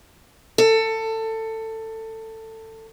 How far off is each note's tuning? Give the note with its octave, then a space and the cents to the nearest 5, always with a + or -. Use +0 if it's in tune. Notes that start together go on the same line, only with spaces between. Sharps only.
A4 +20